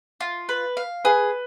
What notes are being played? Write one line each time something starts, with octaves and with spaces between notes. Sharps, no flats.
F4
B4
F5
G#4 B4